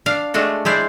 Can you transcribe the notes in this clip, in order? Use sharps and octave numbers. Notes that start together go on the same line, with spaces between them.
D4 F5
G#3 A3 D4 F#4
G#3 E4 C5 D5